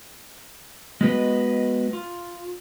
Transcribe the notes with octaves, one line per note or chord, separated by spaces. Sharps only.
G#3 B3 F#4 B4 D#5
F4